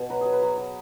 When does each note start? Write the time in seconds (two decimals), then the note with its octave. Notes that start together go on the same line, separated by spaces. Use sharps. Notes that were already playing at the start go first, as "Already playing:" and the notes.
Already playing: B2
0.10 F#3 B4
0.21 F#3 G#4
0.32 B4
0.42 F#3
0.58 F#3